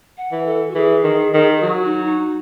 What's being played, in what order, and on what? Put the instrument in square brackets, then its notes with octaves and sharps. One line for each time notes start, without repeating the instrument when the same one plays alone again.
[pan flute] F#5
[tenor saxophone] E3
[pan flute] A4
F#4
[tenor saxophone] E3 [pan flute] G#4
[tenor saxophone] D#3
D#3
[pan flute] G#4
[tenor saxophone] F#3 [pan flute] F#4
[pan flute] D#4
D#4